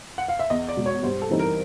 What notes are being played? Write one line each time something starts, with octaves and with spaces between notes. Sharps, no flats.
F#5
F5
E5
E2 D#5
D5
B2 G#3
C#5
G2 C5
A4
E3 G3 C4 D#4
A#4